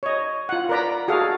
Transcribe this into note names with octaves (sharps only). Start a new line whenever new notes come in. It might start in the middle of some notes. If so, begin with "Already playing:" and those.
C#5 D#5
F4 F#5
A#4 B4 D5 A#5 B5
F#4 G#4 A4 F5